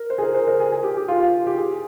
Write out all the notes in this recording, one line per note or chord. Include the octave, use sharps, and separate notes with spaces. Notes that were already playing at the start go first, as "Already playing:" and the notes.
Already playing: A#4
C5
G#4
A#4
C5
A#4
G#4
G#4
G4
G4
F4
G4
G#4